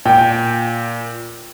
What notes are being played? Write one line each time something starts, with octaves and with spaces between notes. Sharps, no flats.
A#2 G5